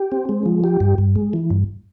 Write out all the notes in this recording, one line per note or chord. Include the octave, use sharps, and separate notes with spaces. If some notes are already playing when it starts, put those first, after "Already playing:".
Already playing: G4
C4
G#3
F3
G4
G2
G2
G#3
E3
G2